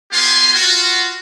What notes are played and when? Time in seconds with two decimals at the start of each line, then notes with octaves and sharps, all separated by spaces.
0.12 B3 F4 G4 F5 G#5 C6
0.54 F4 F#4